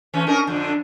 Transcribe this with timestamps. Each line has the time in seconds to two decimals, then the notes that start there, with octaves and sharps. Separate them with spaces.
0.14 E3 A3 C#4
0.27 C#4 D#4 A#4
0.47 F2 D3